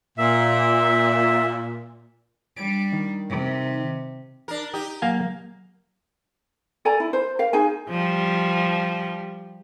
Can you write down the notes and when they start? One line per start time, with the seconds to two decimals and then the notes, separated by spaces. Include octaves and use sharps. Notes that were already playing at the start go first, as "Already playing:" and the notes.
0.18 A#2 E5
2.57 G3 D4 D7
2.92 D#3
3.29 C3
4.48 D4 A#4
4.73 D#4 G4
5.02 F#3 A#3 F5 G#5
6.85 A4 D5 G#5 A#5
7.00 E4
7.13 C5
7.39 A#4 F5
7.53 D#4 G#4 G#5
7.90 F3 G3